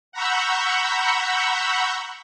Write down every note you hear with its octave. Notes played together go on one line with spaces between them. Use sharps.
F#5 A#5 B5 C#6 E6 G6